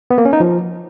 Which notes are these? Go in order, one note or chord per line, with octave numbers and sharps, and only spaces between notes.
B3
A#3
C#4
D#4
F3